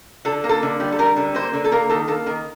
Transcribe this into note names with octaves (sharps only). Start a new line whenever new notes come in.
D3 A4
A#3
A4
D3
G3
A4
G3 A#4
D3
A#3 C5
D3
A4
A#3 A#4
D#3 A4
A#3 A4
D#3 A#4